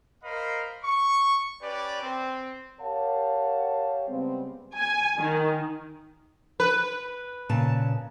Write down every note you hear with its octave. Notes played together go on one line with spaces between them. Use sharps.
A#4 C5 D#5 F5 B5
C#6
C#4 G4 B4 D5
C4
G4 A#4 C#5 F5 F#5 A5
C#3 G3 G#3 B3 C4
G#5
D#3
B4
A#2 C#3 A5